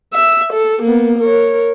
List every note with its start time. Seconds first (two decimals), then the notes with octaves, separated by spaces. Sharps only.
0.14 E5
0.53 A4
0.83 A#3 B3
1.19 A#4 C#5